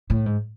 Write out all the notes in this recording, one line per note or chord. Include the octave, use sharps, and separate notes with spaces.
A2
G#2